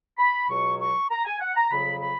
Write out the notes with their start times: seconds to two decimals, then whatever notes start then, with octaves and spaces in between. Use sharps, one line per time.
0.18 B5
0.49 C#2 B2 F#3 C#6
0.79 C#6
1.10 A#5
1.25 G#5
1.40 F#5
1.55 A#5
1.71 F2 C#3 F#3 B5
2.01 B5